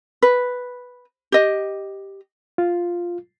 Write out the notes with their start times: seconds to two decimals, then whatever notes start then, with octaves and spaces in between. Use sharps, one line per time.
0.22 B4
1.32 G4 D#5
2.58 F4